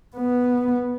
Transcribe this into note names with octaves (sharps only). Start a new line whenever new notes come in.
B3